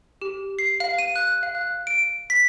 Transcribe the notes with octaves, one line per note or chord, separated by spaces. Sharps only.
G4
C7
F5
D#7
F#6
F5
F#6
D7
B6